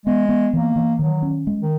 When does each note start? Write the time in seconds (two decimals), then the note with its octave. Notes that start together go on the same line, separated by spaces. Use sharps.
0.06 G#3 B3
0.29 B3
0.53 E3 A#3
0.76 E3
0.99 D#3 F#3
1.22 C#4
1.47 G#3
1.62 D#3